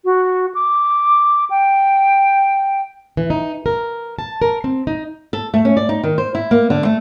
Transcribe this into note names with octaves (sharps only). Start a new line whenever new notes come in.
F#4
D6
G5
E3
D#4
A#4
A5
A#4
C4
D#4
A4
A3
C#4
D5
D#4
D#3
C5
E4
A#3
D3
A3